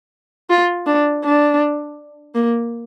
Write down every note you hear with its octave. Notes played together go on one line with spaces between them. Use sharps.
F4
D4
D4
A#3